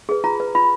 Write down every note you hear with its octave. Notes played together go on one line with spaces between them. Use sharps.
G#4 B4
F4 A#5
B4
F4 B5